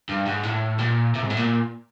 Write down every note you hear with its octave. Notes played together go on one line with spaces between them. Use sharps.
G2
G#2
A2
A#2
C3
G#2
A2
A#2